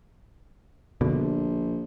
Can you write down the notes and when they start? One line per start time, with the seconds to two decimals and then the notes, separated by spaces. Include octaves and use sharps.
1.01 A#1 B2 D3